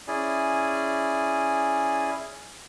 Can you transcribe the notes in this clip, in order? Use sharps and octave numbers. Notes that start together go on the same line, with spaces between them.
C#4 E4 G#4 D5 G#5